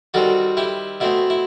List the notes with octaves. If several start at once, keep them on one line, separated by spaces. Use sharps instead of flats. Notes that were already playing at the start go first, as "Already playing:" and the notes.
D#3 G3 C4 F#4 A4
E4 G4
B2 A3 C4 E4
E4